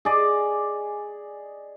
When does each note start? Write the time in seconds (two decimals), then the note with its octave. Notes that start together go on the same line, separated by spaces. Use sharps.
0.05 G#4 D5 D#5